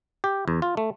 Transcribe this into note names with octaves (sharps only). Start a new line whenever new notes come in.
G4
E2
F4
A3